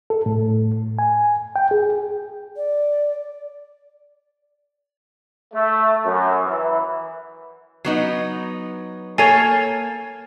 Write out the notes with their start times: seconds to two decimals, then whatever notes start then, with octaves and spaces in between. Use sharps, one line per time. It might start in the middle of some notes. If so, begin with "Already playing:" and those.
0.10 A4
0.26 A2
0.99 G#5
1.56 G5
1.71 G#4
2.57 D5
5.53 A3
6.05 F#2
6.45 E3
7.85 F#3 B3 D#4
9.18 A#3 A4 C#5 G#5